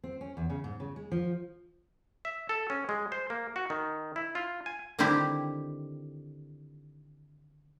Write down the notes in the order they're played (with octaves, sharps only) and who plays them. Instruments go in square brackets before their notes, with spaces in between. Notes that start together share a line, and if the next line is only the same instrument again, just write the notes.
[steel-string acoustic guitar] C4
C#4
E2
C#3
G#2
C#3
G#3
F3
[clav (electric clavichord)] E5
A4
C#4
G#3
C5
A#3
F#4
D#3
E4
F4
G#5
[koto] D3 D#3 G3 C4 E4 G4